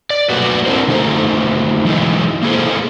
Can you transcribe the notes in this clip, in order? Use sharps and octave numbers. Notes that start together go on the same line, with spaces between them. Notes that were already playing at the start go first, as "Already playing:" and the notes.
D5
F#3 A3 A#3 F#4 G4 B4
C4 D4 E4 F#4 A#4 C5
D3 A3 D#4 A4 C5
E3 F#3 G#3 D#4 E4
A#3 E4 G#4 A4 C5